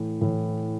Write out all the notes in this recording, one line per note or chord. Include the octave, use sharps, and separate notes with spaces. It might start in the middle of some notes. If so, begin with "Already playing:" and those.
Already playing: A2 E3
A2 E3